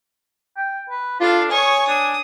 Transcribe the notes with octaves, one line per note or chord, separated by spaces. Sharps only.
G5
B4
D4 F4 A4 F5
C#5 G#5 C#6 D#6
D4 D#6